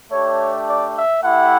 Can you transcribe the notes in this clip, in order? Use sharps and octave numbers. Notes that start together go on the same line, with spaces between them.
A3 D4 G4 C#5
D5
E5
A3 E4 G4 F#5